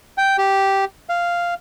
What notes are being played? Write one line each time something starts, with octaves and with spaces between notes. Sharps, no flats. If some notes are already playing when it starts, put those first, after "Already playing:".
G5
G4
F5